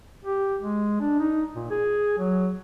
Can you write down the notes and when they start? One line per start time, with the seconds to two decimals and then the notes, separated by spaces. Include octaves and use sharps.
0.25 G4
0.61 G#3
1.01 D4
1.20 D#4
1.55 A#2
1.71 G#4
2.18 F#3